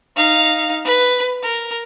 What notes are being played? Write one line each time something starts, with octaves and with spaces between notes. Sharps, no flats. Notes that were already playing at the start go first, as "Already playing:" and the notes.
D#4 F5
B4
A#4